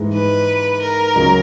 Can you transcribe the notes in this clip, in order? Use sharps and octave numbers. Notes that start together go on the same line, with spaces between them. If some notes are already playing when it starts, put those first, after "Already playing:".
Already playing: G#2 E3 G#3 D#4
B4
A#4
C#2 C#3 F#3 C#4 G#4